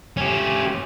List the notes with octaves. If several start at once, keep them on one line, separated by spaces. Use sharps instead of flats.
C#4 G4